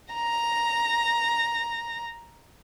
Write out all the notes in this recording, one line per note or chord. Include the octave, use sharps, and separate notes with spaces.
A#5 A#6